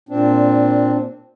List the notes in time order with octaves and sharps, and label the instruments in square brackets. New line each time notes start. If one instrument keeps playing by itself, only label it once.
[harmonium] A#2 C4 D4